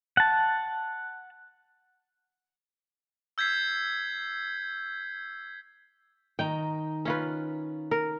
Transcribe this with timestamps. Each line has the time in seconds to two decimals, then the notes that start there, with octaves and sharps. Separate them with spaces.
0.17 F#5 A5
3.38 E6 G6 G#6 B6 C7
6.39 D#3 D#4 G5 A#5
7.05 C#4 F4 B4
7.91 A#4